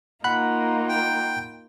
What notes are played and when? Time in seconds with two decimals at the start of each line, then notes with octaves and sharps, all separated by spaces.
0.24 A#3 D#4 F4 F#5 B5 F#6
0.89 G5